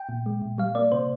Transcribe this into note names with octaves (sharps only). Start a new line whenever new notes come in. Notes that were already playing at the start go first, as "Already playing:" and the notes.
Already playing: G5
A#2
G#3
A#2
G3 F5
A#3 D5
C3 C5